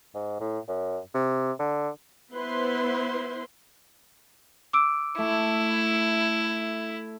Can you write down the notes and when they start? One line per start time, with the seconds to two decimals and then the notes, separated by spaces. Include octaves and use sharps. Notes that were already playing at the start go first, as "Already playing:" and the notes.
0.14 G#2
0.40 A2
0.68 F#2
1.14 C3
1.59 D3
2.34 B3 E4 B4 C5 C6
4.73 D6 E6 D7
5.18 A3 E4